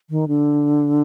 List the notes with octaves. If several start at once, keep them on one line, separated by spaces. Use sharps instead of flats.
D#3
D3